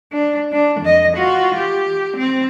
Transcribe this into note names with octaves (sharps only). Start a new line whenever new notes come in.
D4
D4
F2 D#5
F4 F#4
G4
C4